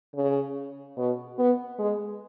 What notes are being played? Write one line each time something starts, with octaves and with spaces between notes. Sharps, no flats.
C#3
B2
B3
G#3